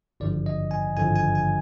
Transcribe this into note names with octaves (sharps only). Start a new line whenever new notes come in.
G#1 G2 D3 F3 D5
D#5
G#5
G#1 G2 D3 F3 G#5
G#5
G#5